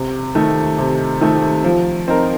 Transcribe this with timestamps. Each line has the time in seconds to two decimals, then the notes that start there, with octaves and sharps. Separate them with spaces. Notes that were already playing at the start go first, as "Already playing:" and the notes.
Already playing: C3
0.35 D#3 A3
0.78 C3
1.21 D#3 A3
1.64 F3
2.08 C4 D#4 A#4